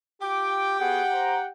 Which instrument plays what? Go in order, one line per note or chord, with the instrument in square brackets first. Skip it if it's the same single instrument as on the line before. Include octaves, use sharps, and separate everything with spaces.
[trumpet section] F4 D6 [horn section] G4 G5
[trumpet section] B3 F#4 G#4 [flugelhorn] F#5
[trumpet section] C5 A#5